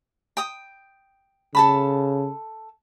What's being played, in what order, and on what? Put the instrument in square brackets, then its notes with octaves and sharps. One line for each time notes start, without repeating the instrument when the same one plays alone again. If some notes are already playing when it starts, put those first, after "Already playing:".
[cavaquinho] G5 D#6
[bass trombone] C#3 [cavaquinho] A4 A5 B5